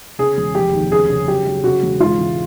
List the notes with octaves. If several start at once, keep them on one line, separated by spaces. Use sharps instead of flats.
C#3 G#4
E1
F1 G4
D#2
C#3 G#4
C#3
F#3 G4
F#3
C#3 F#4
E1
G#2 F4
E3